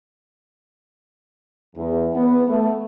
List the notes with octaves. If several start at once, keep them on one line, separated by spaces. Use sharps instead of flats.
E2
B3
A3